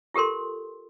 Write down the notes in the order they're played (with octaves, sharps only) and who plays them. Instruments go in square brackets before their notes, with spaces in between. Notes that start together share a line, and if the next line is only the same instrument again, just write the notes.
[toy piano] F4 G4 A4 A#4 C6